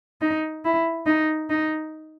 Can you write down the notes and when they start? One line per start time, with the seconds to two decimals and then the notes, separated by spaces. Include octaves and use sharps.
0.21 D#4
0.65 E4
1.06 D#4
1.50 D#4